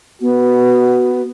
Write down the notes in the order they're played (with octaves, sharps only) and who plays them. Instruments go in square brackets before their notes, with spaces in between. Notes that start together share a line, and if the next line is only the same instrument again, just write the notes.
[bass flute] B3 [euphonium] F#4